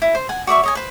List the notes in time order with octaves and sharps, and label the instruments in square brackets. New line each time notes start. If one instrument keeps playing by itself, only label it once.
[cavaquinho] E4
C5
F#5 G#5
F#4 D5 E5 C#6
C#5 D#5 G#5
B4 C5